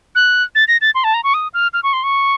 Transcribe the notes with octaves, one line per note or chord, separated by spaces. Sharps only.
F#6
A6
A#6
A6
C6
A5
A#5
C#6
D#6
F6
F6
C#6
C6
C#6